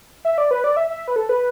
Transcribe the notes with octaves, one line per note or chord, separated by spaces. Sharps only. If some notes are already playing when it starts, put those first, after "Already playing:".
E5
D5
B4
D5
E5
E5
B4
A4
B4